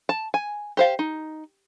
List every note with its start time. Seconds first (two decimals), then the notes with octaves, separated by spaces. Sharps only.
0.09 A5
0.34 G#5
0.77 G4 C5 F5
0.99 D#4